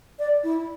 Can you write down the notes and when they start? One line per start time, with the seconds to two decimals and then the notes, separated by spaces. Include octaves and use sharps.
0.19 D5
0.44 E4